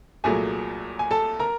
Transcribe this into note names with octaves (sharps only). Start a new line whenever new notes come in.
C2 A#2 F#3 A3 G#4 G#5
G#5
A4 A5
A#4 A#5